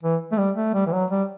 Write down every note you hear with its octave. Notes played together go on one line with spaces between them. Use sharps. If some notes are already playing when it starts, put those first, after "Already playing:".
E3
A3
G3
A3
G3
E3
F#3
G3